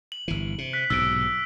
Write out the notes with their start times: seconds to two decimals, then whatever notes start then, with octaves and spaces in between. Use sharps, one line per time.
0.12 F#7
0.28 G1 E3
0.58 C3
0.73 F#6 B6
0.90 B1 G#2 C3 E6 D7